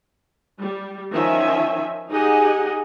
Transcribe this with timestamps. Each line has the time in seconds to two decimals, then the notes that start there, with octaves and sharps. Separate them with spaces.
0.59 G3
1.12 D#3 F3 C#4 E5 G#5
2.11 D#4 G4 G#4 D#5 F#5 G#5